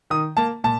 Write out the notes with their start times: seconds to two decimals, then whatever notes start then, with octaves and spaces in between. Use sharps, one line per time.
0.10 D#3 D#6
0.37 A#3 A5
0.64 A#2 A5